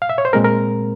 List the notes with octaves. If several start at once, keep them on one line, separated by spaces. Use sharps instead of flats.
F5
E5
C#5
C5
A#2 G#3 C4 A#4
A#4